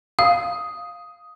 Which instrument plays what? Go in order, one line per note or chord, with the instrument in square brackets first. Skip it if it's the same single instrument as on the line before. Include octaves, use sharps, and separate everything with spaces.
[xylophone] F5 [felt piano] D#6